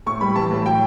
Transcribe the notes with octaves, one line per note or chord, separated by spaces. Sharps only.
A2 C#6
G3 B5
E3 A5
A2
F#3 G5